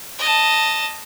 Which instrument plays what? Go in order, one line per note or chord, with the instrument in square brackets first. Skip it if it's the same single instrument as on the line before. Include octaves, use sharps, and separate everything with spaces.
[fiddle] D#5 A5